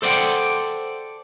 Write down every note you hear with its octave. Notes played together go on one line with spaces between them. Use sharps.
A4 C5 D5 D#5 F#5 G5